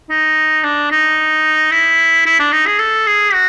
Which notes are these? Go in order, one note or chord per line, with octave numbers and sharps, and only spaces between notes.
D#4
D4
D#4
E4
E4
D4
D#4
G#4
A4
G#4
F#4